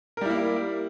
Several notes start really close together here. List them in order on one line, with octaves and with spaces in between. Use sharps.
A#4 G3 E4 A#3